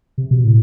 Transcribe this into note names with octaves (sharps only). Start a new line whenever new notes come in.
C3
B2
A2